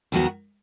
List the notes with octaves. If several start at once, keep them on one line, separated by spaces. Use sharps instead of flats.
D#2 D#3 F#3 B3 F#4